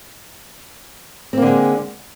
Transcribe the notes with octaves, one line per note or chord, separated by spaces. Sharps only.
D3 G#3 A#3 C4